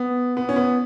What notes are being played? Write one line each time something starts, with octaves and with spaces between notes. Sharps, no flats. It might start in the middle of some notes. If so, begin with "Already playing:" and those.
Already playing: B3
B3
C#4
B3